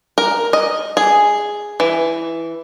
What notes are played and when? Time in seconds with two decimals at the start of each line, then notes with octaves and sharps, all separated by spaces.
0.18 A#4
0.53 D#5
0.97 G#4
1.80 E3